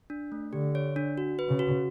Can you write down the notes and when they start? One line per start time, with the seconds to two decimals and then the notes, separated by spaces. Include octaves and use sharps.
0.10 D4
0.32 A3
0.52 D3 G4
0.75 C#5
0.96 D4
1.18 F#4
1.39 B4
1.49 C#3
1.59 F#4